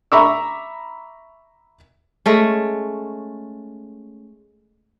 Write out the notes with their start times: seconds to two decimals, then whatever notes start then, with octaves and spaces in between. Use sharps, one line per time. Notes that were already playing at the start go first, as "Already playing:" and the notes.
0.12 E5 A#5 B5 C#6 D6 E6
2.26 G#3 A3 C#4